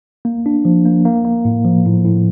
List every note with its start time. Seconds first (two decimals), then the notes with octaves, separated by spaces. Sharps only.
0.25 A#3
0.46 D4
0.65 F3
0.85 A#3
1.05 A#3
1.25 A#3
1.45 A2
1.65 F3
1.86 A2
2.05 A2